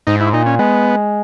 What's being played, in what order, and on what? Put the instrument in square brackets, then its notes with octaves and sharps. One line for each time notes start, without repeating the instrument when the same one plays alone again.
[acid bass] G#2 [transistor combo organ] D#4
[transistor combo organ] E4
[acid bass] A#2 [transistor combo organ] D#4
[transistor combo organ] C#4
[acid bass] G#3 [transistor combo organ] B3